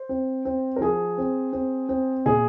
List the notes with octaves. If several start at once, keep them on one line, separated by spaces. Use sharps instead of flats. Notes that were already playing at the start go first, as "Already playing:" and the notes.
Already playing: C5
C4
C4
A#4
F3 G#4
C4
C4
C4
A#2 G#4